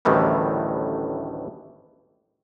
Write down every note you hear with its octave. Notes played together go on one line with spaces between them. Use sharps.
A1 D2 A2 D#3 E3 G3